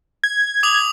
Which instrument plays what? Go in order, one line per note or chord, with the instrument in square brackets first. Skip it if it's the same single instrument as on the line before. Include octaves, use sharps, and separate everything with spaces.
[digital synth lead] G#6
[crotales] D6 D#6 F7